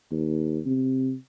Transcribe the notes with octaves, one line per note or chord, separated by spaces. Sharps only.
D#2
C3